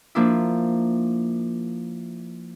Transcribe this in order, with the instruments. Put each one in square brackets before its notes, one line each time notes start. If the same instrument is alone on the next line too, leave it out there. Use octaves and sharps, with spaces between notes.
[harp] F3 A#3 D4 E4